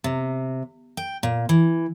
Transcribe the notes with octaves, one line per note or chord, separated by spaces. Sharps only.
C3
G5
A#2
E3